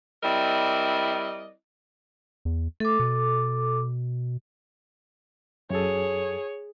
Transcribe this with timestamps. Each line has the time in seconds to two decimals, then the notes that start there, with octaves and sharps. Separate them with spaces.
0.24 G3 C4 E4 A#4 D5 D#5
2.45 E2
2.80 A3 A4 D6
3.00 B2
5.70 F#2 G#4 A4 C#5